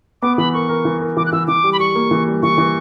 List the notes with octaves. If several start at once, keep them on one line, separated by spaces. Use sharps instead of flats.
B3 D6
E3 B5
A#4 C#6
A#4
E3
A#4
E3 D6
F#6
E3 E6
E3 D6
G3
B5
G3 C#6
A#3
E3
G3
E3 C#6
E3